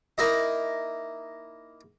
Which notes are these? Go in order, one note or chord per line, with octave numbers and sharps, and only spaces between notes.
A#3 D#4 E4 D#5